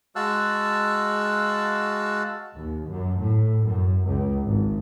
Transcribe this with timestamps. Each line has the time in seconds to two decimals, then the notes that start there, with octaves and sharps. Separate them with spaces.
0.16 G#3 F#4 F5 A5 E6 F#6
2.55 D#2
2.88 F#2
3.20 A2
3.67 F#2
4.05 C#2
4.45 G#1